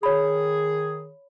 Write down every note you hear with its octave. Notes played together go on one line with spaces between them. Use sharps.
D#3 G#4 C#5 B5